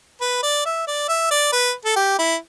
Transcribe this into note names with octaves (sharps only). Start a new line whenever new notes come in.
B4
D5
E5
D5
E5
D5
B4
A4
G4
E4